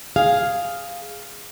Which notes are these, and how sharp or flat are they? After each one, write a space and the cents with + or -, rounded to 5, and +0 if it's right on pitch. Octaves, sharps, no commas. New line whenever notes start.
G#4 +0 F5 +0